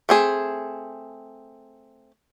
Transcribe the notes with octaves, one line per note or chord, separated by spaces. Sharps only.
A3 C4 G#4